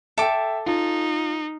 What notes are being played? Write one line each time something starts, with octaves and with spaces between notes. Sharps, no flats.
A4 E5 G5 D6
D#4 F4